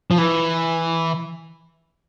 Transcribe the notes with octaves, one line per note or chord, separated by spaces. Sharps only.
F3
E3